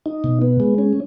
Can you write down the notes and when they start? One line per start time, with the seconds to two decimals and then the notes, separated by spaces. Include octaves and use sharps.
0.06 D#4
0.24 B2
0.42 B3
0.60 G#3
0.78 C#4